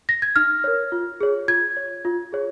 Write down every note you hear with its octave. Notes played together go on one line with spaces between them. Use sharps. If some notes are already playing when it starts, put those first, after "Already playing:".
A#6
G#6
D#4 F6
A#4 C#5
F4
G#4 C#5
F4 G#6
C#5
F4
G#4 C#5